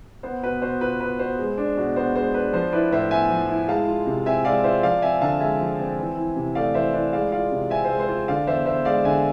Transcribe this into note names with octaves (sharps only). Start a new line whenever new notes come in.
B3 C5
B2 B4
B2 C5
F4 B4
B3 B4
B2 C5
G#3
D4
B2
B3 C5
G#3 C5
D4 B4
F3 C5
E4 B4 D5
A2 C5 E5
B3 E5 G#5
F3
E4
G#3 F5 A5
F4
C3
C4 E5 G#5
G#3 D5 F5
F4 C5 E5
F3 D5 F5
C4 E5 G#5
D3 F5 A5
G#3 E5 G#5
F3
C4
E3
E4
C3
A3 D5 F5
E3 C5 E5
E4 B4 D5
G#3 D5 F5
F4 D5 F5
C3
C4 E5 G#5
G#3 C5 E5
C5
F4
D3 D5 F5
E2 C5 E5
E2 C5 E5
G#3 D5 F5
D3 E5 G#5